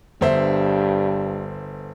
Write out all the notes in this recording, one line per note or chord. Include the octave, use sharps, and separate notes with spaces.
G1 G2 C5 E5